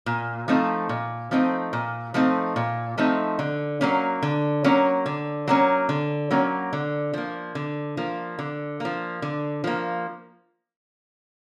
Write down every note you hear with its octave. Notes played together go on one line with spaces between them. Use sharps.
A#2
F3 A3 C4 D#4
A#2
F3 A3 C4 D#4
A#2
F3 A3 C4 D#4
A#2
F3 A3 C4 D#4
D3
F#3 A#3 C#4
D3
F#3 A#3 C#4
D3
F#3 A#3 C#4
D3
F#3 A#3 C#4
D3
F3 A#3
D3
F3 A#3
D3
F3 A#3
D3
F3 A#3